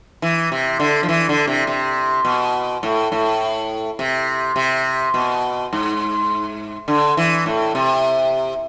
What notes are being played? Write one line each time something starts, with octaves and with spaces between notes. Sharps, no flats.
E3
C3
D3
F3
E3
D3
C3
C3
B2
A2
A2
C3
C3
B2
G#2
D3
E3
A2
C3